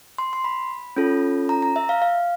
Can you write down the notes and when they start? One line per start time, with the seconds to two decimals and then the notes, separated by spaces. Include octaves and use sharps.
0.18 C6
0.33 C6
0.44 B5
0.96 C#4 F4 A4
1.49 A#5
1.62 A#5
1.76 E5
1.89 F5
2.02 F5